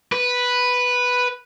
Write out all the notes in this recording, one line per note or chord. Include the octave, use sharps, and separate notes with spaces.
B4